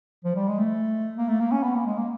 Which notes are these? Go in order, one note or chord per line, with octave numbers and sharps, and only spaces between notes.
F3
G3
G#3
A3
A#3
A3
A#3
C#4
B3
A#3
G#3
A#3